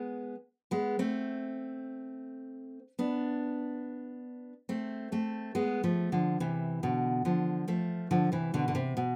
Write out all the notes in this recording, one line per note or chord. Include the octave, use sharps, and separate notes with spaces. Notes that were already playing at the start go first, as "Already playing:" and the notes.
Already playing: G#3 B3
G#3 B3
A3 C4
B3 D4
A3 C4
A3 C4
G#3 B3
F3 A3
D3 F3
C3 E3
B2 D3
D3 F3
F3 A3
D3 F3
C3 E3
B2 D3
D3
C3
B2